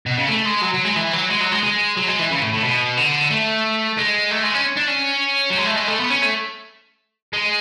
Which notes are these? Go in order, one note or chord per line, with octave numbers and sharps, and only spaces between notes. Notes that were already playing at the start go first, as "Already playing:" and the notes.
B2
C#3
A3
G#3
F#3
F#3
G#3
E3
F#3
G#3
F#3
G#3
G#3
F#3
G#3
E3
C#3
A2
A2
B2
D3
A3
G#3
A3
G#3
C#4
D4
C#4
F#3
G#3
A3
G#3
A3
B3
C#4
A3
G#3